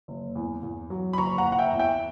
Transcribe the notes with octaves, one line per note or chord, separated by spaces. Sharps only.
F#1
E2
E2
F#3
B5
F#1 A#5 C#6
F#5 A#5
F#1
F#5
E5 G5
E2
E5 G5